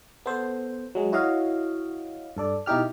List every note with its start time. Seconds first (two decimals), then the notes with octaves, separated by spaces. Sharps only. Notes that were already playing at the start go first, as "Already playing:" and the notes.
0.26 B3 A4 C5
0.95 F#3 G#3
1.12 E4 F#4 C#5 D#5 F5
2.37 G2 A4 D5
2.66 B2 D#4 E4 G4 F6